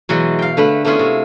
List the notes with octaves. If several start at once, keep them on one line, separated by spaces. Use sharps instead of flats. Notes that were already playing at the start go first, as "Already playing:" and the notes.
B2 E3 F#3 G#3
F5 G5
D3 A3 B4 B5
A3 B3 C#4 E4 F4 G#4
C3